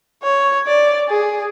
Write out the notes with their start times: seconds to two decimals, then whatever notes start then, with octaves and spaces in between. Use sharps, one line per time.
0.23 C#5
0.67 D5
1.09 G#4